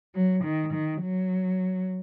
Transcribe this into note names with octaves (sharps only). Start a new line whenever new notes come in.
F#3
D#3
D#3
F#3